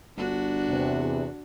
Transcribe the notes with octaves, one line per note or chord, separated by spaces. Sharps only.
G1 D4 F#4
E2 C3